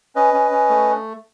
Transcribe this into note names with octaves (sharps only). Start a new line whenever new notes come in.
C#4 B4 D#5
C#4
C#4
A3